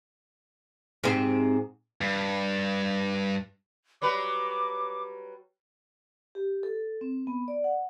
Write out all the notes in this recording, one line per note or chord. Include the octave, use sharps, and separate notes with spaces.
G#2 C3 C4
G2
F#3 G3 B4 D6
G4
A4
C4
B3
D5
F#5